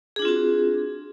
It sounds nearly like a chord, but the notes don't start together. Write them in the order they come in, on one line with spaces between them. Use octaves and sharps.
G#4 D4 F4 C4 F#4